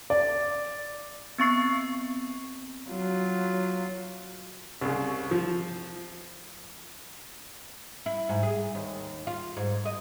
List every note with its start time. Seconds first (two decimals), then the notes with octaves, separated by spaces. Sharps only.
0.10 D5
1.38 B3 C4 C#6 C7
2.89 F#3 F4
4.81 C2 C#3
5.31 F3
8.06 E4
8.29 G#2
8.43 G#4
8.75 D#2
9.27 F4
9.57 G#2
9.85 D#5